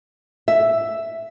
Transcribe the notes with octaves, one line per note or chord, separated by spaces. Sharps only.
E5